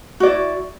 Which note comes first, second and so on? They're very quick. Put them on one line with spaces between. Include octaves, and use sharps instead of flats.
F#4 D5 E4